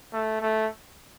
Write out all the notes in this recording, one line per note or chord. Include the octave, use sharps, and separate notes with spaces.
A3
A3